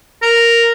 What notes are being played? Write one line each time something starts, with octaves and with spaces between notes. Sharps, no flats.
A#4